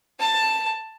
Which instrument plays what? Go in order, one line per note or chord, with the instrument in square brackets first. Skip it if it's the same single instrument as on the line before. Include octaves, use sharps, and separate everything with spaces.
[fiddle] A5